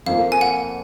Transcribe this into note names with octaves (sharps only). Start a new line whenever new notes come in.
F2 F3 A#3 F5
G#5
F#5